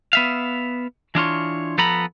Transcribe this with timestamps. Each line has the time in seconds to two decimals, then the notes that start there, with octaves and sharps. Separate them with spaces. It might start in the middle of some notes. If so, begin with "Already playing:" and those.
0.13 B3 E5 F5
1.15 E3 D4 F4 C#5
1.78 F3 B3 A4 A#5 B5